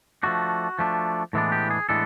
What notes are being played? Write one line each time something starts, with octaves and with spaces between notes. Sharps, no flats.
F3 A3 D4 F#4
F3 A3 D4
A2 E3 G#3 B3 D4
G4
G#4
A2 E3 G#3 B3 D4 A4